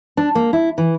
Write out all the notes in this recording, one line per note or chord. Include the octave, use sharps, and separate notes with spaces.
D4
A#3
E4
E3